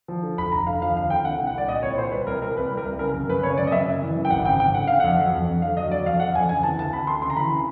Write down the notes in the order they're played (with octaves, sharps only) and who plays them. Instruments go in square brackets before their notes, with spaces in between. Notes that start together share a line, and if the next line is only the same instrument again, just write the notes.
[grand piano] F3
D3
F1 B5
F1 A#5
D3 F5
F3 F5
D#2 F5
D3 G5
C2 F#5
C2
F#5
G3 D5
A#2 D#5
C2 C#5
A#2 C5
G3 B4
C2 A#4
C2 A#4
C2 B4
G3
A#4
C2
C#3 A#4
F#2 A#4
F#2 B4
C#3 C#5
F#2 D5
D#5
F#2 E5
C#3
E3
F#2
G5
G#1 F#5
C#3 G5
C#3 G5
D3 F#5
D3 F5
F2 F#5
F#3
F2
F2
D3 F5
F#3 D#5
F#3 D5
F2 F5
D3 F#5
F2 G#5
C#3 G#5
E3 A5
D2 A5
D2 B5
D2 C6
C#3 C6
A#5
E3 B5
C#3